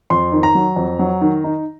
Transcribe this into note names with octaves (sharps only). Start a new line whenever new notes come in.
F2 C6
D#3
A#5
F#3
F2
F#3
D#3
D#4